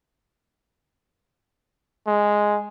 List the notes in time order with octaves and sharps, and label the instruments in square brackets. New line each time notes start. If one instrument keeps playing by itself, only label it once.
[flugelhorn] G#3